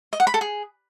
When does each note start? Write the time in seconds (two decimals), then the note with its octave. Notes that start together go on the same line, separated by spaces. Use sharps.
0.13 D#5
0.20 F#5
0.27 B5
0.34 A4
0.41 G#4